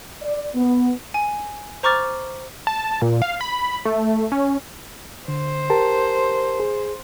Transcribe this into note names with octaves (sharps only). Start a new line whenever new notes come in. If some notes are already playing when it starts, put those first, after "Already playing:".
D5
B3
G#5
C5 A#5 C#6 D6 F6 A6
A5
A#2
F5
B5
A3
C#4
D3 C5
G4 A#4 A5
G#4